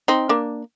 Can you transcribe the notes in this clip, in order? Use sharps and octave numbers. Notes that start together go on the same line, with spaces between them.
C4 D#4
A#3 D4